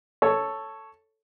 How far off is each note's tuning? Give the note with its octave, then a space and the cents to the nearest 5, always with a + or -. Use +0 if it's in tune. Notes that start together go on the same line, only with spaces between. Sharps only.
A4 +0 C#5 +0